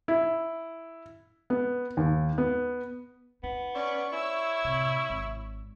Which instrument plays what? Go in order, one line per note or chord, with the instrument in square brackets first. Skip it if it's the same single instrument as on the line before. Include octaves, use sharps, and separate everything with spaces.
[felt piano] E4
B3
D#2
B3
[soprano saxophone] B3 [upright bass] D#4
[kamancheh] C#4 C#6 [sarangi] D5
[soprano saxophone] E4 [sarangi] C#5 [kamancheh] C#6 E6
[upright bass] A2 C3
G#1